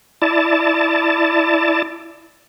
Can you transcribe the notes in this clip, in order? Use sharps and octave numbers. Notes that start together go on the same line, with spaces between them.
E4 D5 A5